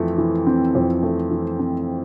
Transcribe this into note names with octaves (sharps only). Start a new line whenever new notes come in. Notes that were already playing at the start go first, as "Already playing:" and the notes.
Already playing: F2 E3 A3 C4
E3
C4
F2
A3
E3
C4